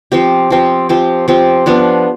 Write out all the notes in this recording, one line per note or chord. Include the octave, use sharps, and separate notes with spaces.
F3 C4 G4
F3 C4 G4
F3 C4 G4
F3 C4 G4
F3 B3 D4